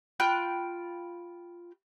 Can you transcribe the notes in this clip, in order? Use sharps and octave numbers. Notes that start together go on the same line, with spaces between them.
F4 G5 B5 F#6